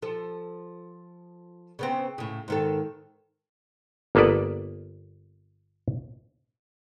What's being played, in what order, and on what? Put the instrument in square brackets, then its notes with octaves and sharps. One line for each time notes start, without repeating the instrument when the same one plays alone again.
[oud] F3 A4
C#3 B3 C4
A2 C#3
G#2 D#3 A4
[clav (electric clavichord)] G1 A#3 B3 A4 B4 D5